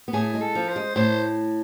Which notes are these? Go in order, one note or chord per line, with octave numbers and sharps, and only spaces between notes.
B3
A2 A3 G#4
G#3
A4
F3
C5
G#3
A2 A3 C5